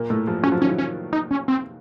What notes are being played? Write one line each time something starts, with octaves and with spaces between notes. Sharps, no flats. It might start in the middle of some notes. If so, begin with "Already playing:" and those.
Already playing: A#2 A#3
A2 A3
F3
F#3 C#4
F3
D#3 C#4
F3
C#4
D#4
C#4
C4